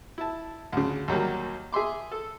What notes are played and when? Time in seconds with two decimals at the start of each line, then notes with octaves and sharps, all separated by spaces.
0.18 E4 A5
0.73 D2 C#3
1.08 D#2 F#3 G3 A#3
1.72 G#4 E5 C6 D6
2.12 A4